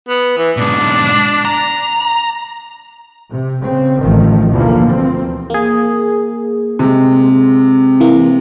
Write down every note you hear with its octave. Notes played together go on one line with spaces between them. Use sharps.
B3
E3
G#2 B2 D4
A#5
C3
C#3 C4
A1 D#3 F3 A3
D2 B2 D3 E3 F3 A#3
C4
A#3 G#4
C3 G#3
E3 A#3